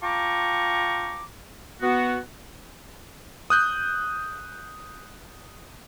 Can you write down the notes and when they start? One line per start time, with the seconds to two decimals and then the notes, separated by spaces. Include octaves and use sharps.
0.02 F4 G5 A5 A#5 C#6 D6
1.82 B3 F#4
3.50 D#6 F#6 G6